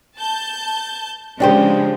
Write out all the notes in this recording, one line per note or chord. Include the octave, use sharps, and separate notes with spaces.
A5 G6
C#3 F3 G#3 D4 G4 C5